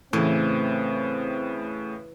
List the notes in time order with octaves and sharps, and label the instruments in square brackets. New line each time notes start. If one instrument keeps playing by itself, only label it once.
[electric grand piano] A2 C#3 [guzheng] E3 [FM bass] A3 [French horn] C4